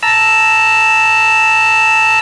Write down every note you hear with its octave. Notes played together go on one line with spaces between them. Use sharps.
A5 A#5 E6